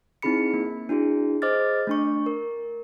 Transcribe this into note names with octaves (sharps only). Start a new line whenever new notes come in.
C4 D#4 E4 G#4 B5 C#7
A#3
D4 E4 F#4 G#4
G#4 C5 D#5 D6 F6 A6
A3 D4 C#6
A#4